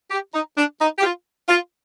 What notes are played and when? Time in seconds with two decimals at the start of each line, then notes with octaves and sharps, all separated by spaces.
0.11 G4
0.34 D#4
0.57 D4
0.81 D#4
0.99 G4
1.03 F4
1.49 F4